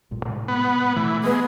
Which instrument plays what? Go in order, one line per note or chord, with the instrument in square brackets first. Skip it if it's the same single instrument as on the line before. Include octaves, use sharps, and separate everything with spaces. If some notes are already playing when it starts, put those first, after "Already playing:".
[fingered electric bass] A1 G2 A#2
A2 C3 G#3
[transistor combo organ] B3
[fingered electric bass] B2 A3 [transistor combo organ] E3
[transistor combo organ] G#3 [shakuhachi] B3